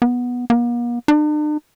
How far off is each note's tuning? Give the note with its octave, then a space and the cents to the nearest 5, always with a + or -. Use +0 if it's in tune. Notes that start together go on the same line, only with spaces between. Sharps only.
B3 -10
A#3 +45
D4 +45